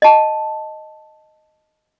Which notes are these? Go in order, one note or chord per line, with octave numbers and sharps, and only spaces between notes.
D#5 A5